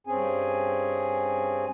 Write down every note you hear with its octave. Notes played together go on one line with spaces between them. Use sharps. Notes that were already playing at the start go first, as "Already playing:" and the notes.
G2 C4 C#4 G#4 G#5